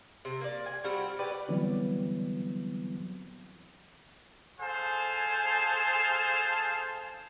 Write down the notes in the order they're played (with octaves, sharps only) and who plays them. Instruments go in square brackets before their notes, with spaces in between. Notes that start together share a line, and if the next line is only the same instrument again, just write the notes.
[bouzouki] C3
A#3 D5
G#5
G3 C4 F4 F#4
G4 B4 D5
[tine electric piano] D3 E3 F#3 G3 B3 C4
[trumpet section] G#4 A4 C5 F5 G#5 A5